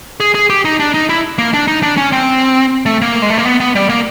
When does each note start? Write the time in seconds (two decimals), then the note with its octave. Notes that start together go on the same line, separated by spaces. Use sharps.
0.20 G#4
0.35 G#4
0.50 G4
0.65 D#4
0.80 D4
0.94 D#4
1.09 E4
1.38 A#3
1.54 D4
1.68 D#4
1.83 D4
1.97 C#4
2.12 C4
2.86 A3
3.02 A#3
3.22 G#3
3.30 A3
3.38 A#3
3.45 B3
3.60 B3
3.75 G3
3.89 A#3